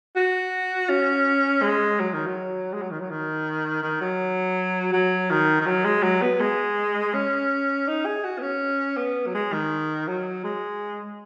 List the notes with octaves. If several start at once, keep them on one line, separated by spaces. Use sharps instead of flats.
F#4
C#4
G#3
F#3
D#3
F#3
G#3
F#3
D#3
F#3
D#3
D#3
F#3
F#3
D#3
D#3
F#3
G#3
F#3
B3
G#3
C#4
D#4
G#4
F#4
B3
C#4
B3
F#3
G#3
D#3
F#3
G#3